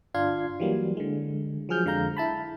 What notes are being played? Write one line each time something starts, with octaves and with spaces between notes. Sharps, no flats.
G1 D4 F4 F5 C6 G#6
E3 F#3 G3 A#3
D3 G#3
F3 F#3 G#4 F6 G6
F2 D3 G#3 F5 A#5 G6
E4 A5 B5